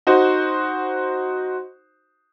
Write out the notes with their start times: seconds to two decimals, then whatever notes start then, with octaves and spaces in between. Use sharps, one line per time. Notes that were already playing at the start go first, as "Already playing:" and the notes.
0.07 D#4 F#4 C5